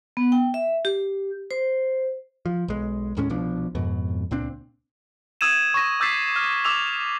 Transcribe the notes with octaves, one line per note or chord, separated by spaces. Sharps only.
B3
G5
E5
G4
C5
F3
B1 G#3
D#2 A2 G#3 C#4
C2 B2 F3 D4
F2 G#2 B2
C#2 A#2 C4 D4
D#6 E6 G#6 D#7 E7
C#6 A#6
D6 E6 G6 A6 B6 C7
F6
D6 E6 F7